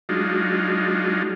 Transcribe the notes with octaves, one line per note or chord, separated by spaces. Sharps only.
F#3 G#3 D4 D#4 F4